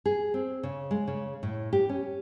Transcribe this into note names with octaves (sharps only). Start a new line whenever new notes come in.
G#4
C4
C#3
G#3
C#3
A2
G4
C#4